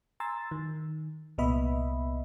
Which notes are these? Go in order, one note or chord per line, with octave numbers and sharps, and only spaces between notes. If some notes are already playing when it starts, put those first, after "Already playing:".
G#5 A#5 C6 E6 A6
D#3
C2 A#2 B3 D#5 E5 B5